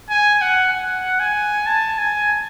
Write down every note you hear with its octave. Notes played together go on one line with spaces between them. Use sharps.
G#5
F#5
F#5
G#5
A5
G#5